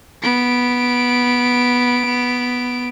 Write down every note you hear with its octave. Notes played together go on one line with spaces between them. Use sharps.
B3 D7